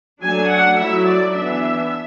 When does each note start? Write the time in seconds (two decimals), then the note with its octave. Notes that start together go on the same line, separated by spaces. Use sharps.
0.21 F#3 A3 D4 G#5
0.50 F#5
0.77 F#3 A3 E4 E5
1.06 D5
1.34 E3 B3 D4 E5